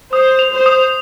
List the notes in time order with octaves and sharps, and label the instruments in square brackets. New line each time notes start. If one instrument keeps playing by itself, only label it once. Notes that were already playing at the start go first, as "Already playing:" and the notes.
[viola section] C5 [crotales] D#6
[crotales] F7
[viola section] C5
[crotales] D#6